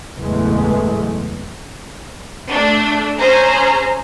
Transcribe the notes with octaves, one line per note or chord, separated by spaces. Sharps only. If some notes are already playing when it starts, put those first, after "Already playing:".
F#1 E2 A2 E3 G#3 A3
A3 D4
C#4 G#4 C5 A#5